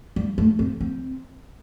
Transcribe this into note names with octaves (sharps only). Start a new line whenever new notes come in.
G3
A3
C4
C4